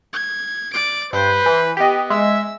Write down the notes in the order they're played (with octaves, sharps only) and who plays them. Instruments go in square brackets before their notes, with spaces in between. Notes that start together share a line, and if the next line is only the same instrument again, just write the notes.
[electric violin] G#6
D5 D7
[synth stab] G2 [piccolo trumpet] B4 [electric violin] C5
[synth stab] E3
[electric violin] B3 [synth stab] G4 D#5
[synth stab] G#3 [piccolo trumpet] E5 [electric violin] E6